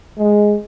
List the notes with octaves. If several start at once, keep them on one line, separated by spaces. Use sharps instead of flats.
G#3